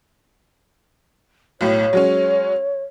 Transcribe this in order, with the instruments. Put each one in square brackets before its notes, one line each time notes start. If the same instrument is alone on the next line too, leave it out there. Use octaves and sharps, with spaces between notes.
[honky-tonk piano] B1 A2 [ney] C#5
[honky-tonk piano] F#3 G#3 C#4